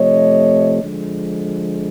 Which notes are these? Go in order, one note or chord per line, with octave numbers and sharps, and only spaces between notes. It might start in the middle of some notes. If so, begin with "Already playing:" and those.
Already playing: C3 F3 A3 C#5 D#5
D3 F3 G#3